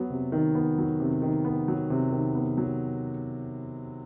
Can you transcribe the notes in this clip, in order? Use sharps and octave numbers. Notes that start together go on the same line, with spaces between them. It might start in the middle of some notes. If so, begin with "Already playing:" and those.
Already playing: F#3 B3
C3
D#3
B3
F#3
C3
D#3
B3
F#3
C3
D#3
B3
F#3